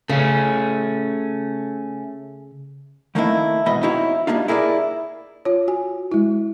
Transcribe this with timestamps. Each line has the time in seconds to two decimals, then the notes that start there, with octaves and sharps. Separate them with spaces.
0.10 C#3 A3 C#4
3.15 D#3 A3 A#3 C4 D#4 E4
3.66 G#2 B2 E3 D#5 B5
3.83 C4 D#4 E4 F#4 C#5 F5
4.27 G3 A#3 D4 D#4 F4
4.48 E4 G#4 A#4 C5 D5
5.45 F4 C#5
5.68 F#4 G#5
6.12 G#3 E4